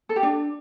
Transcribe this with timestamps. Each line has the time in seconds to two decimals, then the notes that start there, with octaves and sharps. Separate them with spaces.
0.09 A4
0.16 G4
0.23 D4